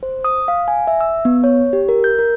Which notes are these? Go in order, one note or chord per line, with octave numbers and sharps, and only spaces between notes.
C5
D#6
F5
G#5
E5
E6
B3
C#5
G4
A#4
G6
A#4